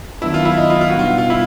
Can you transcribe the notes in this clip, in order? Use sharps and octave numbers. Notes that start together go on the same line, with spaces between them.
D#3 F#3 B3 D4 E4
F4
E4
D#4
F4
F4
F#4
B2 G3 B3 D#4 F4
F4
E4